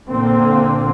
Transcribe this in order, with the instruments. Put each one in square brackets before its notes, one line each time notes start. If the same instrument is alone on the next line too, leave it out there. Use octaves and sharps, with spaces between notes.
[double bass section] A#2 D3 A#3 C4